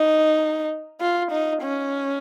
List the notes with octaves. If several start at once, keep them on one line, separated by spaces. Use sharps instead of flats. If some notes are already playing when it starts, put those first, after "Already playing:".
Already playing: D#4
F4
D#4
C#4